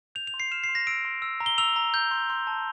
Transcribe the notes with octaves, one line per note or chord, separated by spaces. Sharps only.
G6 F7
F7
C6
C7
F6 E7
C7
C6
A#6
E6 D7
C6
E6
A#5
G7
E6 F7
A#5
G6
C6
C6
A5